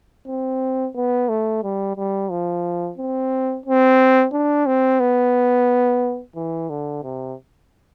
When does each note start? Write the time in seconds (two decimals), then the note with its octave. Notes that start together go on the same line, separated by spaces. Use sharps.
0.28 C4
0.95 B3
1.29 A3
1.63 G3
1.97 G3
2.31 F3
2.98 C4
3.66 C4
4.33 D4
4.67 C4
5.00 B3
6.36 E3
6.70 D3
7.03 C3